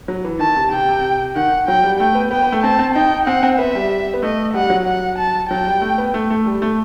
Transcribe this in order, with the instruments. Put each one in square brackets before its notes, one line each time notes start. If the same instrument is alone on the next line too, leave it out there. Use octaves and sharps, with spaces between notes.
[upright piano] F#3
E3
[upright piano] D#3 [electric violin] A5
[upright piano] C3
[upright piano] C3 [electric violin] G5
[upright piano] C3
[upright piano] D#3 [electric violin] F#5
[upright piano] F#3 [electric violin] G5
[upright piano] G3
[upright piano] A3 [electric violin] G5
[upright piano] B3
[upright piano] B3 [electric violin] G5
[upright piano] B3
A3
[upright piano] C4 [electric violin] A5
[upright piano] C4
[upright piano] D#4 [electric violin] G5
[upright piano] C4 [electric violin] F#5
[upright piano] C4
[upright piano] B3 [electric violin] E5
[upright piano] G3
B3
[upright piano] A3 [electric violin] D#5
[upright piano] G3 [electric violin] F#5
[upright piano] F#3
[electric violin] F#5
A5
[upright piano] F#3 [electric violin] G5
[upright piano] G3
A3
B3
A3
A3
G3
A3